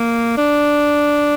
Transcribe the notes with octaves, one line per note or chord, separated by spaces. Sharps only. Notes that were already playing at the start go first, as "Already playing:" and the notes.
Already playing: A#3
D4